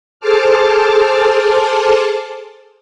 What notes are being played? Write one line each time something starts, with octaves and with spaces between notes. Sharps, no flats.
G#4 A4 C5 A5 D6 F6